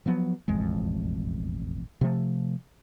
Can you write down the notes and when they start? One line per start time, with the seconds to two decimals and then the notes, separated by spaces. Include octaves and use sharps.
0.06 F3 F#3 B3
0.48 E1 A1 F2 G#3
2.01 C3 F3 A3